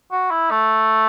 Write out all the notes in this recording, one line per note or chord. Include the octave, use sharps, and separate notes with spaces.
F#4
E4
A3